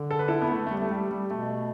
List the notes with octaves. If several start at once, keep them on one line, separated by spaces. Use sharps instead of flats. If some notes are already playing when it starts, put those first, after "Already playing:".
Already playing: D3
A4
B4
E4 A4
B3
A3
A3
G3
A3
G3
G3
B2 A3